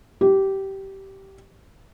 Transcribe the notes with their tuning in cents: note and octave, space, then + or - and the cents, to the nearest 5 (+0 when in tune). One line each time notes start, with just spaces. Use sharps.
G4 -15